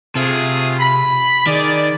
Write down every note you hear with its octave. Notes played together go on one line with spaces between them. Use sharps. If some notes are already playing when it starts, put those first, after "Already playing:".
C3 A3 F4 G#4
B5
D#3 G#4 D5